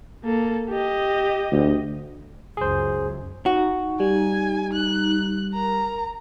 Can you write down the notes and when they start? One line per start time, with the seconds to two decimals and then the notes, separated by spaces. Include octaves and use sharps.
0.24 A#3 A4
0.70 G4 D#5
1.52 D2
2.57 C#2 F#2 G#4 C5
3.46 D#4 F#4
4.00 G3 G#5
4.73 F#6
5.54 A#4 A#5